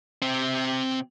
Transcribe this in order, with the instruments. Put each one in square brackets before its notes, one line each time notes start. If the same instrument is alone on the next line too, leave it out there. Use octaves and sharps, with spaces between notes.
[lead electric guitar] C3 C4